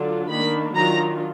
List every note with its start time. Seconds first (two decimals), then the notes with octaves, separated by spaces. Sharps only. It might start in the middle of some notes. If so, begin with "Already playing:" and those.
Already playing: D3 F#3 D4 F4
0.30 D#3 A#3 D4 B5
0.76 D#3 F#3 D4 F4 A#5